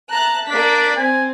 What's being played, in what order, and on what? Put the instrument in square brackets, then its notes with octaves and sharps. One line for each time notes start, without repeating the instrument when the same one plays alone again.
[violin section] E5 A5 F#6 [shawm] A#5
[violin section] A#3 D5 B6 [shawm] D4
[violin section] C4 [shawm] G#5